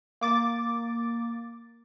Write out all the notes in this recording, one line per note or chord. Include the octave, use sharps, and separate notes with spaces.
A#3 D6 A6